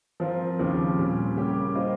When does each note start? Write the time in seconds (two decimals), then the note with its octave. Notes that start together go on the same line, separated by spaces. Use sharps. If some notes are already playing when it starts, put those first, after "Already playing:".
0.20 F3 C4 F4 A#4
0.59 D#2 C#3 F3 C4 G4
0.98 A#2 G3 C#4
1.36 C#3 G3 A#3 C#4 G4
1.75 G3 A#3 F4 C5 D#5